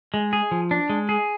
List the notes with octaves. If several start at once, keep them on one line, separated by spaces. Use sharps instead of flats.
G#3
G#4
F3
D4
G#3
G#4